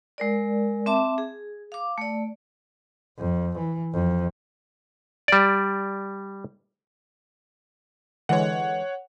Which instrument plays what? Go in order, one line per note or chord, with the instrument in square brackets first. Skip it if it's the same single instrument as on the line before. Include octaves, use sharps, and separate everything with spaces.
[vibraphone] G#3 A#4 D5
C4 E5 A5 D6
G#4
F5 D6
A3 D5
[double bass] F2
E3
F2
[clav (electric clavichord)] G3 D5
[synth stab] D3 E3 G#3 [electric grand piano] C#5 F#5